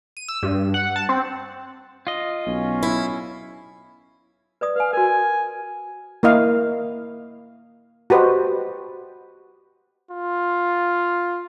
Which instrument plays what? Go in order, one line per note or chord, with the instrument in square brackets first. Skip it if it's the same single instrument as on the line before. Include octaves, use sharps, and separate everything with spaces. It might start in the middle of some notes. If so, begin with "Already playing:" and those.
[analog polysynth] D#7
E6
G2
F#5
A5
C4
[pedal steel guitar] F4 D#5
[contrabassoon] B1 [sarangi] C#4
[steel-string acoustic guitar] E4
[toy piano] B4 D5 D#6
[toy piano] B4 G#5 [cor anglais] F5
[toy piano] F#4 A#4 [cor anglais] G#5
[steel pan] A#3 E4 D#5 F5
F#4 G4 B4 C5 D#5
[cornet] F4